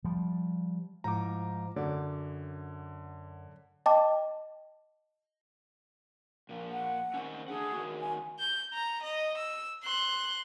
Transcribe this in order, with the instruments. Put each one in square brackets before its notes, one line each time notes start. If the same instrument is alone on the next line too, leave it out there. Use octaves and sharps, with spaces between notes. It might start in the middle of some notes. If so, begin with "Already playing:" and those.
[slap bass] F3 G3
[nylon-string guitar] G#2 F3 [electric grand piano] A#5 D6
[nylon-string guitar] F#2 F#4 D5 [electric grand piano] D3
[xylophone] D#5 G5 A5 D6
[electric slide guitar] A#2 F3
[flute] F#5
[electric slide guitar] D#3 C4 C#4
[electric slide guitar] A3 D4 F#5 [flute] G#4
[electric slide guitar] D#3 B3 F#4
[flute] G#5
[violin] G6
A#5
D#5
E6
C6 F#6